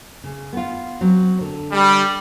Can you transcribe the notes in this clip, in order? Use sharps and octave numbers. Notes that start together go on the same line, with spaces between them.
C#3
B3 F4
F#3 C4
D3
G3